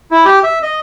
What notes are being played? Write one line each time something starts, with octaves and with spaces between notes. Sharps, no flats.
E4
G4
E5
D#5